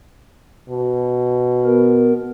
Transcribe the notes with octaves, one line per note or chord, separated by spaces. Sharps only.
B2
B3 A#4